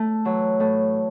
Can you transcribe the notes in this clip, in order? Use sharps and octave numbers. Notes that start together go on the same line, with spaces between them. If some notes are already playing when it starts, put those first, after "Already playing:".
Already playing: A3
E3 F#3
A2